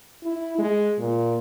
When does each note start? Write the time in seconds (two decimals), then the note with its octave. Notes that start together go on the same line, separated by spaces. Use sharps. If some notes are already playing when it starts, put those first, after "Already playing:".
0.24 E4
0.58 G#3
0.99 A#2